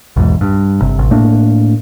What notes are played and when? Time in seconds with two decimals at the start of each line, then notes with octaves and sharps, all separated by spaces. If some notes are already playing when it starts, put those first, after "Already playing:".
0.16 B1 E2 G#2
0.41 G2
0.82 G1 C3
0.99 A1
1.11 A2 A3 A#3 D4